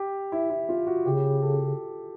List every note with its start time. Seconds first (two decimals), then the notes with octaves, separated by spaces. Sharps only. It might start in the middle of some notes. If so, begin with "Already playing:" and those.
Already playing: G4
0.32 E4
0.50 E4
0.69 F4
0.87 F#4
1.05 C#3 G4
1.42 A4